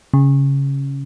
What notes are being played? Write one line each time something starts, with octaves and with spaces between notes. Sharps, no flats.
C#3